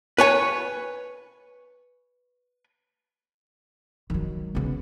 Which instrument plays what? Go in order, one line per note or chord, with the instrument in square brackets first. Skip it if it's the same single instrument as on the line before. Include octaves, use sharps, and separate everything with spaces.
[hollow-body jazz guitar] B4 C#5 G#5
[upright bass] D#3 F#3
C#3 B3